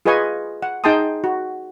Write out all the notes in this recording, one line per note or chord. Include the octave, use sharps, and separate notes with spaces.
F4 G#4 B4 D#5 G#5 C#6
F#5
D#4 G#4 G5 A5 C6 D#6
F#4